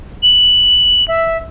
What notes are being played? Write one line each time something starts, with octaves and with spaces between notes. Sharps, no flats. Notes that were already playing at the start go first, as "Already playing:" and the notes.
F#7
E5